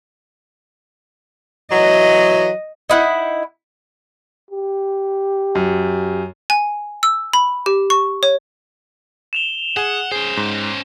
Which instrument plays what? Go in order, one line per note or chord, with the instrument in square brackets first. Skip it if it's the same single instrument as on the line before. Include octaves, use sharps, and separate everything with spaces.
[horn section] E3 F#3 [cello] D#5
[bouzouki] D#4 E4 F#5
[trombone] G4
[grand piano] F#2
[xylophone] G#5
E6
B5
G4
C#6
C#5
[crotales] E7 F7 G7
[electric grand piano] G#4 G#5 [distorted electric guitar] F#5
[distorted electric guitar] C#4 C5 [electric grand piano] G#4
[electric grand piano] G#2